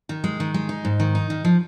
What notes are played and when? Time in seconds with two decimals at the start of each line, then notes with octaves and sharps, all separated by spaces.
0.09 D#3
0.24 G#3
0.40 D#3
0.54 G#3
0.69 D#4
0.85 G#2
1.00 D#3
1.15 D#4
1.30 D#3
1.45 F3